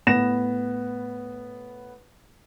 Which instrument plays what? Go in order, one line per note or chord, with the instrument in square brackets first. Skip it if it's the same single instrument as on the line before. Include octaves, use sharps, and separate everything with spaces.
[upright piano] A2 B3 A#6 E7